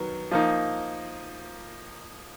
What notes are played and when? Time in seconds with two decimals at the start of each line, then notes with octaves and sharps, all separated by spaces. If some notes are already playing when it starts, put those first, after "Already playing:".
Already playing: D#3 F#3 B3
0.31 F3 A#3 D#4